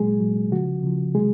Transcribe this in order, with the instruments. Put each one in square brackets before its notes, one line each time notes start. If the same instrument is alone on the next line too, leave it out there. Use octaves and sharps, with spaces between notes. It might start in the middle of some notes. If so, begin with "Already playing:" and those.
Already playing: [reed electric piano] A#2 F#3 G#3 G#4
A#2 F#3
C#3 F3 F#4
C#3 F3
C3 D#3 F#3 G#3 G#4